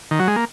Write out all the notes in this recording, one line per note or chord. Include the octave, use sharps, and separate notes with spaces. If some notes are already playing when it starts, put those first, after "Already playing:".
D#3
F#3
G#3
A#3